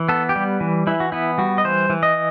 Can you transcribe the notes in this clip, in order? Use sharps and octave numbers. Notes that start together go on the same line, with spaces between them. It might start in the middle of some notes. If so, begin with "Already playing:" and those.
Already playing: E3
B3 A4
G4
G3
E3
E3 E4
F#4
B3 E4
G3 F#4
D#5
E3 C5
E3
D#5